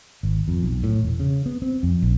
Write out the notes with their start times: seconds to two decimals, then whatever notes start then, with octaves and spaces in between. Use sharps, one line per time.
0.23 G#1
0.48 F2
0.63 B1
0.84 A2
1.03 E1
1.20 C#3
1.46 B3
1.62 C4
1.83 F2
2.02 A#1